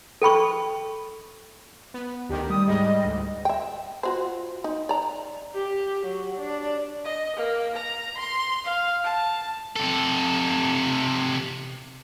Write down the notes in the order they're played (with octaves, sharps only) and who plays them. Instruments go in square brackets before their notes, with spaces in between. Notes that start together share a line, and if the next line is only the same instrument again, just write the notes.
[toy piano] A4 G5 B5 C#6
[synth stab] B3
[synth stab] D2 D#3 [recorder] G4
[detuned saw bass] G3 [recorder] D#6
[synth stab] G#2 G#3 [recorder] D#5
[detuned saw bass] D2
[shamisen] E5 G5
F4 F#4 C5
D#4
D5 A#5
[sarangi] G4
F#3
D4
[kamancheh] D#5
A#3
A#5
C6
F5
A5
[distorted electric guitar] C3 A4